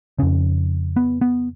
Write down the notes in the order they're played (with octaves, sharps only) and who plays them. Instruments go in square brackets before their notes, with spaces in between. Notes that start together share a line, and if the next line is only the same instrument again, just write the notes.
[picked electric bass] F2 C#3 C#4
B3
B3